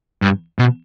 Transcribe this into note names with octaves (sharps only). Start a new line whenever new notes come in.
G2
B2